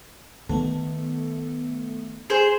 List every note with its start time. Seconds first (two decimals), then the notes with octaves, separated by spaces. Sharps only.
0.49 D#3 A3 B3 A4
2.30 G#4 C5